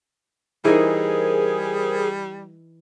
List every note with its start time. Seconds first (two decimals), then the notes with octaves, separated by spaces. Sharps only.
0.65 E3 G3 D#4 G#4 A#4 C5